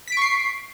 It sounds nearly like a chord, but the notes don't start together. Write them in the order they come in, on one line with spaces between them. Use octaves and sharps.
B6 D7 C#6 C7